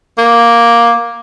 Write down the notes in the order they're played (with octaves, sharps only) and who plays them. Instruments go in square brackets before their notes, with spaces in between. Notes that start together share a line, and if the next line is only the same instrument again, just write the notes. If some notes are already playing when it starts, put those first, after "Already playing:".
[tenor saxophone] A#3